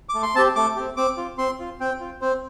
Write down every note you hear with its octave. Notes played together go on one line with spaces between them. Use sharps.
D6
A3
C6
C4 G4 A5
A3 D6
C4 G4
C4 D6
F4
C4 C6
F4
C4 G5
F4
C4 C5